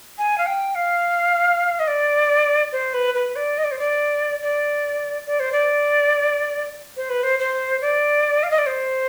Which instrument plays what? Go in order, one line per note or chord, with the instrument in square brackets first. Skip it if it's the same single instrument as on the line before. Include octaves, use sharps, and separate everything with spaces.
[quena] G#5
F5
G5
F5
D#5
D5
C5
B4
B4
D5
D#5
D5
C5
D5
D5
D5
C5
D5
C5
B4
C5
C5
D5
F5
D#5
D5
C5